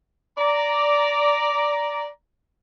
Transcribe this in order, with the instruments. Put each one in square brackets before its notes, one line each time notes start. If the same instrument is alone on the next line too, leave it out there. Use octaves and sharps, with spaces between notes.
[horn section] D5 A#5